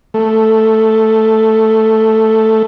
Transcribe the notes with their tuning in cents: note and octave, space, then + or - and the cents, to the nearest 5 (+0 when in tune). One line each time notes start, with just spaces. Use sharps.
A3 +0